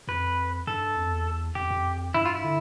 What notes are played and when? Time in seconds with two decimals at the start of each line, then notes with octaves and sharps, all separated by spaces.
0.08 F2 B4
0.67 G2 A4
0.96 F2
1.11 E2
1.55 F2 G4
1.70 F2
2.14 G2 E4
2.25 F4
2.35 E4
2.44 D3